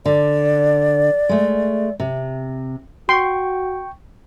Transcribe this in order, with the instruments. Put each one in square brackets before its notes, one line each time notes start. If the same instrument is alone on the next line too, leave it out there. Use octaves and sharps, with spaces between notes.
[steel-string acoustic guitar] D3 [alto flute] D5
[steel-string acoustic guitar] G#3 A3
C3
[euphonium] F#4 [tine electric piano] G5 C#6 [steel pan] C6